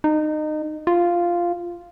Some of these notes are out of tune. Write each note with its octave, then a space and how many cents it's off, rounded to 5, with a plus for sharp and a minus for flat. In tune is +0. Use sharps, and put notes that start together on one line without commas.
D#4 -25
F4 -5